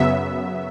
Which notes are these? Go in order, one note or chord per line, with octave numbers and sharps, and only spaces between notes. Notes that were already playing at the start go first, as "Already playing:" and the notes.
Already playing: F#2 C#3 F#3 B3 E5